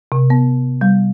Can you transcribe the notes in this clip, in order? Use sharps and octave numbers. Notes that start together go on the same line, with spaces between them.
C3
B3
G3